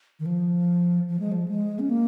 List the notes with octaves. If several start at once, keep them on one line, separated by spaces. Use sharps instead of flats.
D#3
F3
F3
G#3
F3
G#3
C#4
A#3